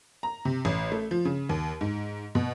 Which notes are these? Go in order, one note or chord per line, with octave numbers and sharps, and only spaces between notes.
A#5
C3
A1
A3
F3
C#3
D#2
G#2
B2